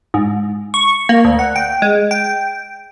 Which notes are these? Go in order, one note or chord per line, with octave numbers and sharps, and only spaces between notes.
G#2
C#6
A#3
D2
F#5
G5
G#3
G5